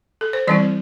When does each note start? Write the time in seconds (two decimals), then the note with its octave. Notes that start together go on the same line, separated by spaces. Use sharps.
0.21 A4
0.33 C5
0.47 E3 G3 C4 E4 D5